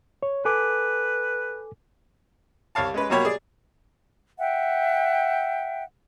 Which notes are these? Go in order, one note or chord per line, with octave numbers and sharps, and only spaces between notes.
C#5
A4 B4 G#5 D6
C2 C#5 F5 A5
G#3 C#4 B4
B2 F#3 A#3 G4 C#5 B5
G#4 D5
E5 F#5 G5